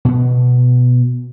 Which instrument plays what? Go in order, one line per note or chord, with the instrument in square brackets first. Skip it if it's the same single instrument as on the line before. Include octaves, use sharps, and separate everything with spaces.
[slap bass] B2 B3